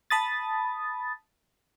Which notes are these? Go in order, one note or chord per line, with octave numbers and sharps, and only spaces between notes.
A5 B5 D#6 A6